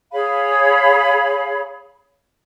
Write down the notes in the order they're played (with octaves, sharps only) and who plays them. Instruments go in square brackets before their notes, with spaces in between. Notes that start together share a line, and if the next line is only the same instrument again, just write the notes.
[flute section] G#4 C#5 F5 B5